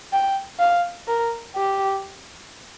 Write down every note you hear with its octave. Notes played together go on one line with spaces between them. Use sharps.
G5
F5
A#4
G4